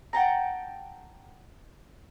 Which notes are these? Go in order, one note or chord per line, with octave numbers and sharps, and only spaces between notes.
F#5 G5 A5 A#5